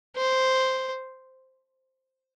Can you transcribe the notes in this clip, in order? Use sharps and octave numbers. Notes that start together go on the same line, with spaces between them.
C5